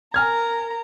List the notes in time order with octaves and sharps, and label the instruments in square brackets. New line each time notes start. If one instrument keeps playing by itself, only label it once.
[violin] A#4 A#5 [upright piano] G#5 F6 G#6